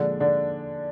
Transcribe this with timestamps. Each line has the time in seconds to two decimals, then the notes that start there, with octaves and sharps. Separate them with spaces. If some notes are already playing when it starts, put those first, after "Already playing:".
Already playing: A#2 D3 F3 G#3 D4
0.20 D3 D4